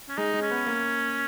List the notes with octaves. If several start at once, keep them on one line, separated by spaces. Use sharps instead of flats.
C#4
G#3 D#4
G#3
C#4
B3
A#3